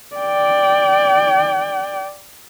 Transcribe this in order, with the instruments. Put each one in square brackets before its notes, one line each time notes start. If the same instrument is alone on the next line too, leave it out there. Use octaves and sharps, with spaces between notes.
[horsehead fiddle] D5 G5